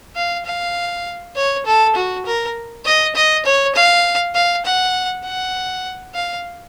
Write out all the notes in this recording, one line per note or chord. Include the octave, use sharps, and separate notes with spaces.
F5
F5
C#5
A4
F#4
A#4
D#5
D#5
C#5
F5
F5
F#5
F#5
F5